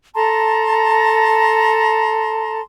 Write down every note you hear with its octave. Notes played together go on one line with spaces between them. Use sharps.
A4 A5 A#5 C6